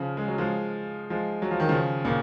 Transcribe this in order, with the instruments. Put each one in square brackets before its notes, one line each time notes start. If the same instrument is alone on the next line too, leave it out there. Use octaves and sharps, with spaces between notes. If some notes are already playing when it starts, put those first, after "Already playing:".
Already playing: [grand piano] C#3 F3
G#3
F#3
F3 G#3
F3 G#3
F#3
F3
D#3
C#3 F3
A#2 C#3